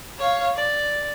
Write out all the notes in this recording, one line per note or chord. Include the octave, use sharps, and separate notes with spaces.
C#5 F5
D5